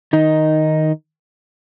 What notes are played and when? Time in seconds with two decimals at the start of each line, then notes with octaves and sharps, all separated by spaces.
0.13 D#3 D#4